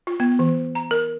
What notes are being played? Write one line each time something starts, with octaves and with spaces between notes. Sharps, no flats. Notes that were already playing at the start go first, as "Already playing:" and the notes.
F4
B3
E3
A#5
A#4